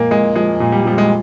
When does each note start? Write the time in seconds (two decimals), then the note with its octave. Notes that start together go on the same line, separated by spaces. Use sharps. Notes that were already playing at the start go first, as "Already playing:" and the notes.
Already playing: A#2 F3 G#3 A#3
0.11 A#2 G#3
0.36 F3 G#3
0.60 A#2
0.72 G3
0.85 F3 G3
0.98 G#3